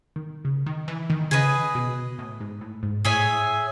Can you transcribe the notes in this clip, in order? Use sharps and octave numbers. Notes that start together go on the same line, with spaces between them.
D#3
C#3
D#3
E3
D#3
C#3 G#4 B4 D#5
B2
A2
G#2
A2
G#2
A2 G#4 C#5 E5 G#5